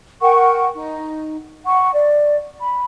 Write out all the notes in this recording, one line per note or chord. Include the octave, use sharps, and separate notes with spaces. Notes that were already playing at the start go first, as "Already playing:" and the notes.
A#4 F#5 G5 C#6
D#4
F#5 C#6
D5
B5